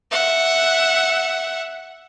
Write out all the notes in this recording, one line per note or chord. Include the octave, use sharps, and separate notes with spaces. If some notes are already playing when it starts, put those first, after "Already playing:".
E5 F#5